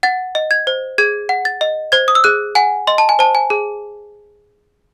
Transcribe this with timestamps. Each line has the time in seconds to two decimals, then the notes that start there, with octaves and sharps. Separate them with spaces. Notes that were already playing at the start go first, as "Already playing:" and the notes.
0.03 F#5 A6
0.35 D#5
0.51 G#6
0.67 C5
0.98 G#4 G#6
1.29 F#5
1.45 A6
1.61 D#5
1.92 C5 G#6
2.08 D#6
2.15 E6
2.24 G#4 F#6
2.55 F#5 G#5
2.87 D#5 C6
2.98 A5
3.09 G#5
3.19 C5 A5
3.35 G#5
3.50 G#4